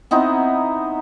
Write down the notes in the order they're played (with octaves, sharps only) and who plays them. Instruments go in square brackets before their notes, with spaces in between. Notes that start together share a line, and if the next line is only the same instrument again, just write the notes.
[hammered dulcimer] B3 C4 D#4 E4